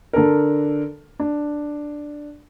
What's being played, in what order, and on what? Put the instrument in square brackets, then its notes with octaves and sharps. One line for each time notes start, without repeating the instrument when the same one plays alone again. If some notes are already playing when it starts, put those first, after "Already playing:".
[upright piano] D3 D4 A4 A#4
D4